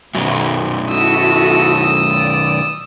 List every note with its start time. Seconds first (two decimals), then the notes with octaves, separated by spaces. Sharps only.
0.15 B1 F#2 B2
0.88 E4 F#4 A4 D#6 E6
2.10 D5